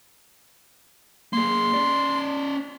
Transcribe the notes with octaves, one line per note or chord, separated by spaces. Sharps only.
A#3 G#4 C6
C#4 D5